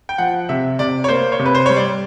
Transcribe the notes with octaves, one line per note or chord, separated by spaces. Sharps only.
G5
F3 F#5
C3 E5
C3 D5
C#5
A#3 C5
C#5
C3
B4
C5
G3 C#5
D5